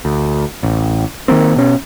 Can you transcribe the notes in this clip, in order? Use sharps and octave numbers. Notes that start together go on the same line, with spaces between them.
D2
A1
D#3 F3 A#3 C4
B2 C#4